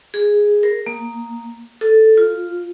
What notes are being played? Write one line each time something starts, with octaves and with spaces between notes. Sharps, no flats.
G#4
A#4
A#3
A4
F4